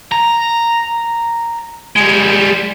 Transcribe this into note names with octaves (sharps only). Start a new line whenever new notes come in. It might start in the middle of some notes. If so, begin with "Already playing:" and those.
A#5
G3 G#3